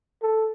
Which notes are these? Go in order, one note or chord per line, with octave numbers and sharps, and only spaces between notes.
A4